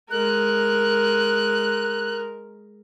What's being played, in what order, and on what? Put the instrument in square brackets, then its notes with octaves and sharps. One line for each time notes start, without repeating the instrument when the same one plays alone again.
[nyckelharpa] G#3 A#4 [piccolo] F#6